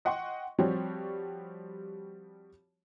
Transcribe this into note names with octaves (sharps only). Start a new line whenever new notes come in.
D#5 F#5 G5 C6 C#6
F3 G3 C4 F#4 G4 C#5